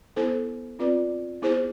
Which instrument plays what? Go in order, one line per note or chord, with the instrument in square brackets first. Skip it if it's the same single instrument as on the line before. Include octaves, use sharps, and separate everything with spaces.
[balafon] B3 E4 A4 C5
C4 F4 B4 D5
B3 E4 G#4 C5